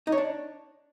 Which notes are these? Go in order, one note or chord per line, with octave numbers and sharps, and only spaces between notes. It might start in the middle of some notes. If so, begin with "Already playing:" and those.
D#4
C#5
D4